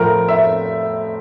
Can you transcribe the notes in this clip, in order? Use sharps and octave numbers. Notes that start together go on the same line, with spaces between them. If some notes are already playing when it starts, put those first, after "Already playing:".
Already playing: A2 F3 A3 A#4
E5